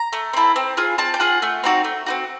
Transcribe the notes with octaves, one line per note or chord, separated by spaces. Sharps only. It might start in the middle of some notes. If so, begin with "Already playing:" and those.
Already playing: A#5
A3
C4 E4 A4
C4
F4 G#4
C4 A5
G5
F4 G#4 F#5
A3
C4 D#4 F#4
A3
C4 D#4 F#4